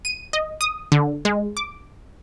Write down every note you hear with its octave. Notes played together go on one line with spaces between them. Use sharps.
D#7
D#5
D#6
D3
G#3
D6